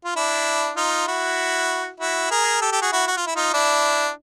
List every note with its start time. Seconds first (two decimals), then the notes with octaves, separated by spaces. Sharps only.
0.04 F4
0.16 D4 E4
0.77 D#4 F4
1.07 E4 F#4
2.00 E4 F#4
2.31 G#4 A#4
2.61 G4 A4
2.72 G4 A4
2.82 F#4 G#4
2.92 E4 F#4
3.08 F#4
3.17 F4
3.26 E4
3.36 D#4 F4
3.54 D4 E4